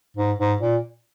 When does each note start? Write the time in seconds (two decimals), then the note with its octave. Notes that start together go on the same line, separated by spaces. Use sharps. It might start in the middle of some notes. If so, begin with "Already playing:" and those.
0.17 G#2
0.38 G#2
0.61 A#2